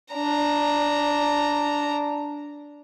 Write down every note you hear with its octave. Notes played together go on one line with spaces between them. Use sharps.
D4 A#5